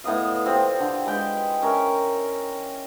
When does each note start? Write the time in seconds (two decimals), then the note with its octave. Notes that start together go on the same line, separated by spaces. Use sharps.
0.04 A2 B3 D#5 F5
0.45 G3 C4 F4
0.80 D3
1.06 G#3 B4 G5
1.62 C#4 A#4 E5